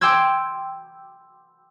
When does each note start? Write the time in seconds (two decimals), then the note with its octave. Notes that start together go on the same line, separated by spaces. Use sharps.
0.01 G5 C6 D6 E6 G#6